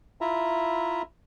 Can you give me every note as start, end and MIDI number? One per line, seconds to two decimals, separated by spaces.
0.21 1.02 64
0.21 1.02 65
0.21 1.02 76
0.21 1.02 82